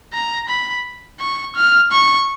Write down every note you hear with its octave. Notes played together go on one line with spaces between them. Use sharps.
A#5
B5
C#6
F6
C#6